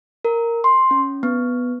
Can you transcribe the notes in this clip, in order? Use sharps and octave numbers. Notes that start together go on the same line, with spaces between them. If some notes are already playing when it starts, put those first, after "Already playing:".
A#4
C6
C#4
B3